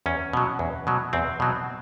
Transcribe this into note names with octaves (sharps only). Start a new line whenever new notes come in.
E2 C#4
B2 F#3
E2
B2 F#3
E2 C4
B2 F#3